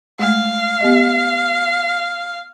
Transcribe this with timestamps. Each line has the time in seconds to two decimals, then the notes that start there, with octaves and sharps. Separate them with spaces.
0.19 G#3 A3 F5
0.81 B3 G4 D#5